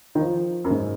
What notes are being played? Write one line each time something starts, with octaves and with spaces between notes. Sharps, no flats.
D#3
F3
F#2
G#2